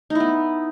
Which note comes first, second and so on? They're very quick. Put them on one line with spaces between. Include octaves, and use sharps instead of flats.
D#4 E4 B3